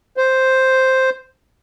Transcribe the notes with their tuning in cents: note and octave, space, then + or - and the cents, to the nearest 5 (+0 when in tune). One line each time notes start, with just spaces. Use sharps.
C5 +0